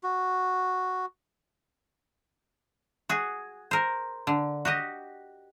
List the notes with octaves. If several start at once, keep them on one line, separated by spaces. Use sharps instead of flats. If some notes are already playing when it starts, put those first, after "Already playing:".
F#4
F#4 G#4
A#4 C5
D3
F#4 G4 D#5